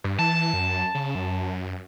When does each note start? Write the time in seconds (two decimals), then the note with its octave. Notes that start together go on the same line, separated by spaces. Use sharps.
0.04 G2
0.19 E3 A5
0.54 F#2
0.95 C#3
1.15 F#2